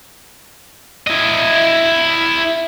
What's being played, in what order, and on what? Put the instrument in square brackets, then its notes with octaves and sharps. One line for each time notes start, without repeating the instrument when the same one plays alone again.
[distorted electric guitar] E4 D#5